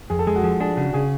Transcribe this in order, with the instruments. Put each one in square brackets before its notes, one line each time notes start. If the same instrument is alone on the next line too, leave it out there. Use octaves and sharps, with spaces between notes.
[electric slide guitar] F2 [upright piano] G#4
[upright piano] A4
[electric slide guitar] G#3 [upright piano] G#4
[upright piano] F#4
[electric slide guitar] F3 [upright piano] G#4
[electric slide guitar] D4 [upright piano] G#4
[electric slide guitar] C#3 [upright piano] F#4
[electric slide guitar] C#3 [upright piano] G#4